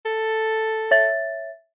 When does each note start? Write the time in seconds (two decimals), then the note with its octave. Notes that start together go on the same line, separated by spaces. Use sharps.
0.06 A4
0.91 C#5 E5 A6